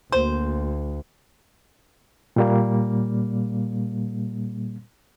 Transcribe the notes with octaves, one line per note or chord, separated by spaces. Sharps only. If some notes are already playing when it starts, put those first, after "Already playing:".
D2 A#3 F#4 C5
A#2 G3 A#3